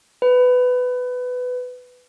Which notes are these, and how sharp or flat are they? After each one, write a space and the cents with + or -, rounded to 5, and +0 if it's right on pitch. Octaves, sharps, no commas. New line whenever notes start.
B4 +15